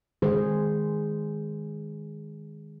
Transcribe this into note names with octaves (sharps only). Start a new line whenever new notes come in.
D#3 G#3 G#4 C5